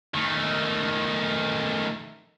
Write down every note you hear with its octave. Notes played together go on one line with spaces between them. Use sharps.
D#3 A3